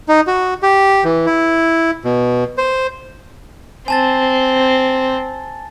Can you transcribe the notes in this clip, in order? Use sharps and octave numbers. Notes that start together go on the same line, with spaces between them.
D#4
F#4
G4
E3
E4
B2
C5
C4 G#5 A5 A6